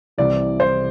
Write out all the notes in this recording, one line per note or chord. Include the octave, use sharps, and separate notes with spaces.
C2 C3 E3 D5
C5